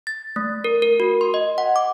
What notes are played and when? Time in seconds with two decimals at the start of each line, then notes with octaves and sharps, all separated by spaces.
0.07 A6
0.36 A3
0.64 A#4
0.82 A#4
1.00 F#4
1.21 C6
1.34 D#5
1.58 F#5
1.76 D6